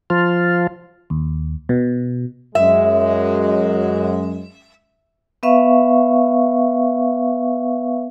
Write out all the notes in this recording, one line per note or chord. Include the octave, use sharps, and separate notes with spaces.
F3 F4
D#2
B2
F#2 G#3 E5
B3 B4 E5 F5 C#6